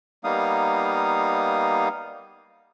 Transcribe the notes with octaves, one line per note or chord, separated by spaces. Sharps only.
G3 A#3 B3 D#4 F5 D#6